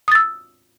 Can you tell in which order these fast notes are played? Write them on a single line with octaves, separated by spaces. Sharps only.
D#6 A6 E6